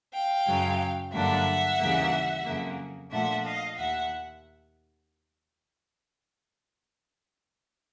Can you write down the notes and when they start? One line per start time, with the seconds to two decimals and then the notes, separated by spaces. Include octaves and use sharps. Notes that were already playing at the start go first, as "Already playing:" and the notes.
0.13 F5 G5
0.47 F#2 C#3 F#3
1.13 G2 D3 F#3 A#3 D4 E5 F#5
1.80 D#2 C#3 E3 G3 A#3
2.46 F2 C#3 F#3 A#3
3.12 A#2 F3 A3 D4 E5 F#5
3.45 D#5 F5
3.78 D#2 E5 F#5